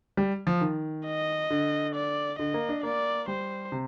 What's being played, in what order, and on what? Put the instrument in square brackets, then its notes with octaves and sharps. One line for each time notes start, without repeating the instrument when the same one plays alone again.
[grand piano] G3
F3
D#3
[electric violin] D#5
[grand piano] D3
[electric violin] D5
[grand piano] D3 [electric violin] D#5
[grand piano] A#3
D4
[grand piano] A#3 [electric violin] D5
[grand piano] G3 [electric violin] C5
[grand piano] C3